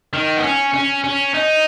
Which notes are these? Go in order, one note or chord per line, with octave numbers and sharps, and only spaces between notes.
D#3
B3
C#4
C#4
C#4
D#4